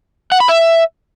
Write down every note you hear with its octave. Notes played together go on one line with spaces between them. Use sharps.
F#5
B5
E5